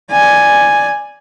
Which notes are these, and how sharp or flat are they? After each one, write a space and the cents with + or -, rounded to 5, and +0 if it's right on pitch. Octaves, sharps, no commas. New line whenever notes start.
D5 +0 G#5 +0